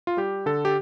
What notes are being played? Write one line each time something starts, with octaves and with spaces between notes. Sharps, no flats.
F4
G3 G4
D3 A4
G4